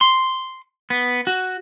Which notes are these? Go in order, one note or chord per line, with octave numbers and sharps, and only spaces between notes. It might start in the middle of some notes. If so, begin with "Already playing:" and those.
C6
B3
F#4